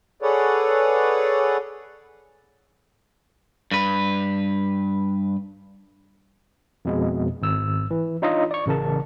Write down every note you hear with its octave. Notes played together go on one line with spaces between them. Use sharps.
G#4 A4 B4 C#5 D5 F#5
G2 B4
F2 B2 G#3
G#1 E6
E3
D4 D#4 F4 C#5 D#5
D5 C#6
A1 C#3 A#4 A5